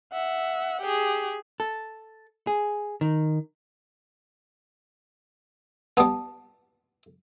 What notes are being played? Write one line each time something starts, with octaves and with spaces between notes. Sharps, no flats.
E5 F#5
G4 G#4
A4
G#4
D#3
G3 B3 A5 D#6